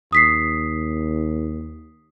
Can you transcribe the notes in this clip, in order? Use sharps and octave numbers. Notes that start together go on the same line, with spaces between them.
D#2 D#6 B6 C7